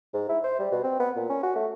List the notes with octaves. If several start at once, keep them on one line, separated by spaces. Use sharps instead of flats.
G#2
E4
C5
G3
B2
C4
B3
A#2
C#4
F#4
A3